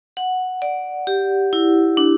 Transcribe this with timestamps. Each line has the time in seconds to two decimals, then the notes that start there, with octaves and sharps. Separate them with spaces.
0.17 F#5
0.62 D5
1.07 G4
1.53 E4
1.97 D4